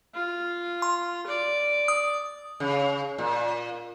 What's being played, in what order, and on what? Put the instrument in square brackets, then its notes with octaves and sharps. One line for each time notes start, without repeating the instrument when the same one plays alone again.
[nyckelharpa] F4
[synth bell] C6
[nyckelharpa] D5
[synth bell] D#6
[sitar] C#3
A#2